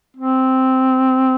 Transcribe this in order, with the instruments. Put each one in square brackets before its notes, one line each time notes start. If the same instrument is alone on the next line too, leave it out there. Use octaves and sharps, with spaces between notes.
[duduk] C4